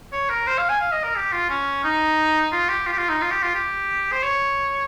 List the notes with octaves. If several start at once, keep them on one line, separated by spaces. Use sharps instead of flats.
C#5
A#4
C5
F5
G#5
F5
D#5
A#4
G4
F4
C#4
D#4
F4
G4
F4
G4
F4
D#4
F4
G4
F4
G4
C5
C#5